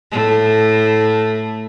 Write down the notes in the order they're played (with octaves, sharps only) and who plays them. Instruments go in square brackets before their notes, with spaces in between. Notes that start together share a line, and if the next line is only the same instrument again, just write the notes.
[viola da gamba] A2 A3